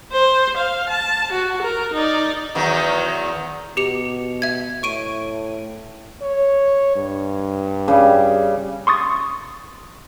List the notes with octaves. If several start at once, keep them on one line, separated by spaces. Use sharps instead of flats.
C5
F5
A5
F#4
A#4
D#4 D5
E2 D#3 F#3
B2 G4 C#7 F7
E5 G#6
A2 C#6 D7 D#7
C#5
G2
C#3 G3
C6 C#6 D#6 A6